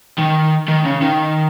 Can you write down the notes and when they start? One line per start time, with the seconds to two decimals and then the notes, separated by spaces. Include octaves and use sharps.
0.18 D#3
0.68 D#3
0.85 C#3
1.02 D#3